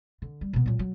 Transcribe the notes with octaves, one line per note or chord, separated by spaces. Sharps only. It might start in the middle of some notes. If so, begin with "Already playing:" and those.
D3
G3
B2 B3
A#2 F#3
F#3